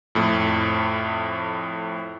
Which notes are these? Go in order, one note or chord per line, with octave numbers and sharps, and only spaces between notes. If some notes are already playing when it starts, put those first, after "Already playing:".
F2 A2